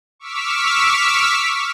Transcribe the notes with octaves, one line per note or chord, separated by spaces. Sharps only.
C#6 D6 E6 F6 B6